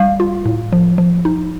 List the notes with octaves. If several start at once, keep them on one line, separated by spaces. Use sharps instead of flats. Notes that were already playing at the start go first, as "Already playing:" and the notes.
Already playing: G3 F5
F4
A2
F3
F3
D#4